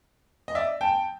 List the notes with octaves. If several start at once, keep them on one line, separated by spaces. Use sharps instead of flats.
D#5
D5 E5
G5 A5